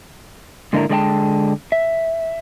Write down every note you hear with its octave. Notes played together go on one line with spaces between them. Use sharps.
G#2 D3 A#3 D4 E4 A#4
D3 G#3 A4 D5 G5 A5
E5